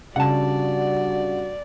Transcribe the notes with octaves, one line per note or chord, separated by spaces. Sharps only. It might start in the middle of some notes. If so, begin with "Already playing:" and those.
C#3 G3 D4 F#4 D5 F#5 A5